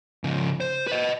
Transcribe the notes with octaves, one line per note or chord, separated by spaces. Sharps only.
C#3 F3
C5
B4 D#5